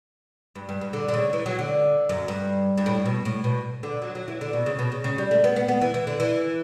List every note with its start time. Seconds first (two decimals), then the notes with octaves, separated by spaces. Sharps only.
0.55 G2
0.69 G2
0.81 G2
0.93 D3
1.08 D3
1.14 C#3
1.33 E3
1.46 F#3
1.59 D3
2.09 F#2
2.28 G2
2.78 G2
2.86 A2
3.06 B2
3.25 A2
3.44 B2
3.83 D3
4.02 F#3
4.15 F#3
4.28 E3
4.41 D3
4.53 B2
4.66 C#3
4.79 B2
4.92 C#3
5.04 C#3
5.18 G3
5.31 A3
5.44 B3
5.56 B3
5.68 B3
5.81 E3
5.94 E3
6.07 D3
6.20 E3